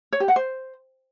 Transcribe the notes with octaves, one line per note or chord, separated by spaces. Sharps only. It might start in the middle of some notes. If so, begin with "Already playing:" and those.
C#5
G4
F#5
C5